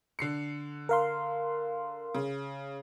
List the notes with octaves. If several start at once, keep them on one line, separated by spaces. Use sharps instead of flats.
D3 C7 C#7
A#4 F5 C6
C#3